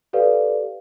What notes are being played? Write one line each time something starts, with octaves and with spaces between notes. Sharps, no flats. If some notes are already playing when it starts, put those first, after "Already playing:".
G4 A4 B4 D5 F5